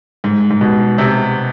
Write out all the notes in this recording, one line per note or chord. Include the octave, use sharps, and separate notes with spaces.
G#2
G#2
B2
C3